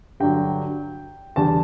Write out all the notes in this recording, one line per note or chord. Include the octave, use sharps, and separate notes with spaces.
G2 D3 F#3 G5
E2 D3 G3 A5